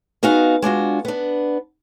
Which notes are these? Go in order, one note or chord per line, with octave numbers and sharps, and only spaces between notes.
B3 D#4 F#4 G#4 F5
G#3 D4 F4 F#4
B3 D4